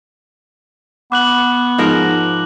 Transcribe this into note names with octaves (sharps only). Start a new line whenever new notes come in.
B3 D6 F#6 F#7
G#2 F3 A#4